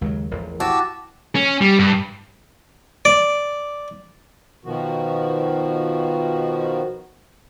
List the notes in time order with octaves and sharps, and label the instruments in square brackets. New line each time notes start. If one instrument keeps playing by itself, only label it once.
[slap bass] D#2 C#3 F#3 [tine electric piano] G#3
[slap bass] A1 E2 [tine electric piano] F3 A#4
[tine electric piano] E4 [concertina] F#4 A5 E6 [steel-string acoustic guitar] G4
[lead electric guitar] C#4
G3
G2
[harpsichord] D5
[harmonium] B2 D#3 F3 F#4